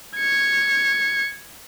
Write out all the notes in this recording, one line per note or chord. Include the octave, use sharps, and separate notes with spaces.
G#6 C#7